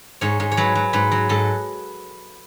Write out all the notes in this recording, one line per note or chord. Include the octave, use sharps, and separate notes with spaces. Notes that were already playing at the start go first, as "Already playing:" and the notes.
G#2 C#5
G#2
C#5
F#3 B4
F#3
G#2 B4
F#3
G#2 A4